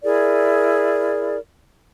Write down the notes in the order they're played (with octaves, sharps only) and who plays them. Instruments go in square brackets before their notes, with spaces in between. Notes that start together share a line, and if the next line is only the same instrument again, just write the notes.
[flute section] E4 G#4 A#4 D5